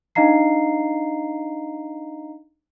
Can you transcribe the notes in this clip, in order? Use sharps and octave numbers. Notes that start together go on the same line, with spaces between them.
D4 D#4 D#5 F5 A#5 C7